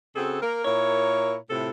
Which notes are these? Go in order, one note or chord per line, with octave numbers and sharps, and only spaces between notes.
C#3 C4 F#4 G#4 A4
A#3 A#4
A#2 E4 A#4 C#5
A2 C3 E4 F4 A4